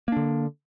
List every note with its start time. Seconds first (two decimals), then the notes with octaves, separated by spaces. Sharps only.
0.08 A#3
0.12 D4
0.17 D3